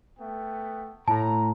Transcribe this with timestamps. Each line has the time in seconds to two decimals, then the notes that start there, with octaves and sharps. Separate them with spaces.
0.19 A3 B3 G5
1.08 A2 A5 A#5